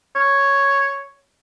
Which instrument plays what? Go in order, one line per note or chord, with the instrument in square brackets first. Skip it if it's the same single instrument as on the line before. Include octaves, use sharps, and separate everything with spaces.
[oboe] C#5